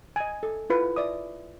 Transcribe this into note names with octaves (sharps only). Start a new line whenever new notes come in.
D#5 G#5
A4
E4 F4 B4
D5 E5 D#6